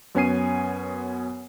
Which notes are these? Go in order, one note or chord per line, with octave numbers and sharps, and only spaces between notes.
F#2 B3 C#4 G#5 C7 D#7